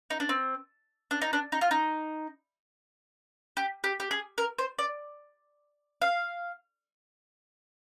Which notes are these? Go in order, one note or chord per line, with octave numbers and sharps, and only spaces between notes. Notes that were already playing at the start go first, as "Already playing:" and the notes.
D#4
D4
C4
D4
D#4
D4
D#4
F4
D#4
G4
G4
G4
G#4
A#4
C5
D5
F5